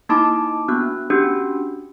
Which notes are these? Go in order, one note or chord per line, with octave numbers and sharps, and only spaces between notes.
A#3 D#4 E4 A5 B5 D6
B3 D4 F#4 F#6
C#4 D4 F#4 G4